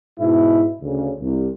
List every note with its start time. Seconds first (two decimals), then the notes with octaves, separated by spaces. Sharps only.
0.20 G#2 B2 E4
0.81 D2 C#3
1.20 C2